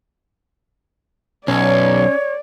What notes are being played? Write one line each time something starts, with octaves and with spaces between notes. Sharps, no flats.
B1 C#4 C#5 D5